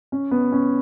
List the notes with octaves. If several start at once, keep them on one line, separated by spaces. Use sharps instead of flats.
C#4
B3
C#4